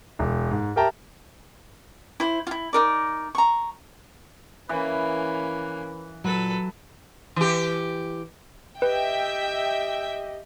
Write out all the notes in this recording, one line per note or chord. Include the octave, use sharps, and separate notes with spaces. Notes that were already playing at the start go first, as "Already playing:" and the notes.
E1
G#2
G4 A#4 E5 G5 A5 A#5
E4 C5
E4 F4
D#4 A#4 D5
A#5 C#6
E3 A#3 C#4 B4
A#2 F#3 A4 B4
E3 G4
G4 B4 D#5 E5 G5